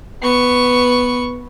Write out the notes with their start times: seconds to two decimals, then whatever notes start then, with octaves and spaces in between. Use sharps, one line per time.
0.22 B3 C#6